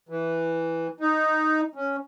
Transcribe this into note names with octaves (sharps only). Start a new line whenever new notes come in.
E3
D#4
C#4